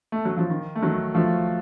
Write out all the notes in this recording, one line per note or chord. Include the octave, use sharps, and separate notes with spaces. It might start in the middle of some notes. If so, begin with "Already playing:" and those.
A3
F#3
F3
D#3
A3
D#3 F#3
F3 A3